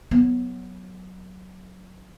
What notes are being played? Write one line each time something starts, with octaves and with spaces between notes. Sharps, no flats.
F#3 B3